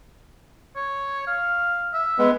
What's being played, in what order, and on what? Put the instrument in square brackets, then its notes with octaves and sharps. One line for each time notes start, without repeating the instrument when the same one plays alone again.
[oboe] C#5
F5
E5
[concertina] G#3 B3